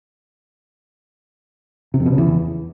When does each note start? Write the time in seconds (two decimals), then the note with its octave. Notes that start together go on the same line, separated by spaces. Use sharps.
1.94 C3
2.00 F2
2.06 B2
2.12 C#3
2.18 E2